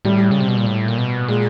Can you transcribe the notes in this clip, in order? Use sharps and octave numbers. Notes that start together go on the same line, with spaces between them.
A2 G3
C#3
C3
B2
A#2
A2
A#2
B2
A#2 G#3